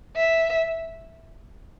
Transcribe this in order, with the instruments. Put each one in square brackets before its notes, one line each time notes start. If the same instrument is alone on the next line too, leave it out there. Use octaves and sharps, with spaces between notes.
[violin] E5